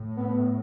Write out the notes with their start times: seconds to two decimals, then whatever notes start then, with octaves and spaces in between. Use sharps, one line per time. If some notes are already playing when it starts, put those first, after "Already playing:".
Already playing: A2
0.17 B3